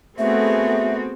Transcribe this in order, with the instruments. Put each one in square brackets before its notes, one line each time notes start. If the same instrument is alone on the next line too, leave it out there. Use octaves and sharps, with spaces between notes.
[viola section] A3 B3 G#4 [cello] C4 F#4 [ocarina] E5